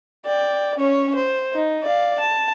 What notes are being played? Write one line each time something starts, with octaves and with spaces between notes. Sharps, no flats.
D5 G5
C#4 C#5
C5
D#4
D5 F5
A5